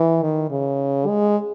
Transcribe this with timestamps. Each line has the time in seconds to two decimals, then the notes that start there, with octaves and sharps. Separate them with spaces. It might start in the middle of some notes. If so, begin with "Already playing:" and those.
Already playing: E3
0.23 D#3
0.51 C#3
1.07 G#3